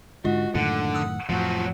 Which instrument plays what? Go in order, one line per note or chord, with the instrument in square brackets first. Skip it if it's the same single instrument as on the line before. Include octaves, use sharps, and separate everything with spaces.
[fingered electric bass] G#2 D3 [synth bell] G#3 F4 D#5 [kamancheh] F#4
[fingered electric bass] F#2 A2 D#3 [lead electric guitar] D3 [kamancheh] F#5
[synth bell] D#6 E6
[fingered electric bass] F2 A2 [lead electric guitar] F3 F#3 [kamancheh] F#4